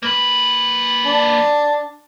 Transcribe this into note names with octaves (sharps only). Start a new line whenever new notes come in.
A#3 B4
D4